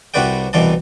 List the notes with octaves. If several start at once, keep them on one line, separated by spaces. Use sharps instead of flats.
C2 C3 F#4 B4 D5 G5
C2 B2 E3 D5 A5